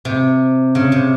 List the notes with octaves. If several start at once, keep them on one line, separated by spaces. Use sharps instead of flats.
C3
C#3
C3